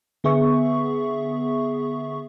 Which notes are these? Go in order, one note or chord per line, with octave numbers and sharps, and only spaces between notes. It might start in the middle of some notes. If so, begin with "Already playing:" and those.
D3 B3 G#4 E5 C#6